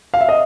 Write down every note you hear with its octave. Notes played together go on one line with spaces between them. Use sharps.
F5
E5
D#5